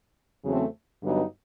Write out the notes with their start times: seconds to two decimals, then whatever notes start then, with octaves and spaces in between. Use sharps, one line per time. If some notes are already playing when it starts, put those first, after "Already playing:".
0.43 E2 C#3 F#3 A3 C4
1.02 G2 D3 F#3 B3 D#4